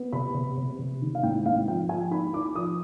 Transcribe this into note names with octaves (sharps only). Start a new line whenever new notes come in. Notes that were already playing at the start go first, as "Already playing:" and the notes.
Already playing: B3
C3 B5
C3
C3
C3
D#3
F5
G#2 G5
G#2 F5
F3 G5
F3 G#5
D#4 B5
D#4 D6
F3 D#6